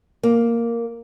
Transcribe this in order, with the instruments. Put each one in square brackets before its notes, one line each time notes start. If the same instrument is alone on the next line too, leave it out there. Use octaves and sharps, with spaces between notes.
[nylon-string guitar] A#3